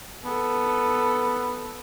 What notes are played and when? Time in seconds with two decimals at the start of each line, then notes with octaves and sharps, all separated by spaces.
0.25 B3 A4